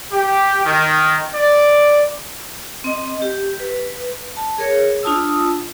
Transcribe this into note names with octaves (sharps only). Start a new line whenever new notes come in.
G4
D#3
D5
C4 D#5
G4
B4
A5
G#4 A#4 C#5
D4 F4 A5 D#6 E6